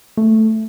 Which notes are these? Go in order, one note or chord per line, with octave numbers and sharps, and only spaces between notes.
A3